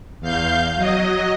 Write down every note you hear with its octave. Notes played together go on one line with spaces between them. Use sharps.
E2 F5 G6
F#3 D#5